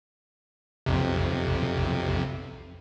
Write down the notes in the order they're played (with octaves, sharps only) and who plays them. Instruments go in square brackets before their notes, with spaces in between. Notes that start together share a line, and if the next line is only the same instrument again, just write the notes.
[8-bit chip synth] B1 F2 C3